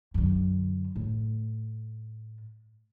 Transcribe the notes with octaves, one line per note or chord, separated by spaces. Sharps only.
F#2 D3
A2